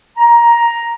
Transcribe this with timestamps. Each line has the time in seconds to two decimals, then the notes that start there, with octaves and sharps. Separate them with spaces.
0.17 A#5